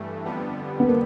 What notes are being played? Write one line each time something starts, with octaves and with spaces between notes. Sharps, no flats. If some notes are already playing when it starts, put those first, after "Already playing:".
Already playing: G2 E3 A3
F2 D3 G3 B3
B3
A#3